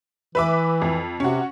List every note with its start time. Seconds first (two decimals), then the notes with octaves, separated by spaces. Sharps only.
0.35 E3 B4 E5 D6
0.82 F2
1.20 C3 C#4 F#4